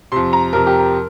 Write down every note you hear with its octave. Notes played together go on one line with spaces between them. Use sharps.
F2 C3 C6
A#5
F2 C3 A#4
G4
A#4